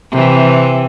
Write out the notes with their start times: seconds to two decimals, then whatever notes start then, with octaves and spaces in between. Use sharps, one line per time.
0.12 C3 E3